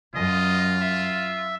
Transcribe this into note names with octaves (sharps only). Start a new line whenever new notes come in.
F#2 F4 D#5
E5